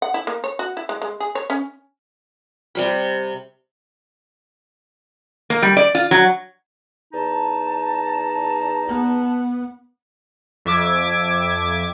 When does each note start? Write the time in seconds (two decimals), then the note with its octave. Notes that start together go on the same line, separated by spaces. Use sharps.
0.02 F#5
0.14 E4
0.27 A#3
0.44 C#5
0.59 F#4
0.77 E4
0.89 G#3
1.02 G#3
1.20 G#4
1.35 C#5
1.50 C#4
2.75 C3 G3 B5
5.50 A#3
5.62 G3
5.77 D5
5.95 F4
6.11 F#3
7.13 E2 D#4 A5
8.87 B3
10.65 F2 E5 D6 G#6